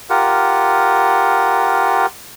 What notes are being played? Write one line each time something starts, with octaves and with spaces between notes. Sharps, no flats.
F4 G4 A#4 F#5